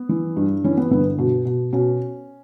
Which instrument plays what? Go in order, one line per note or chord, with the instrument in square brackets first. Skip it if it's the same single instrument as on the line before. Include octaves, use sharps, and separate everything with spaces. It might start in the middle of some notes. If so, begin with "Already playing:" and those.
Already playing: [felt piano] B3
E3
G2
E3 C#4
B3
G1 B3
B2
B2
B2 C#4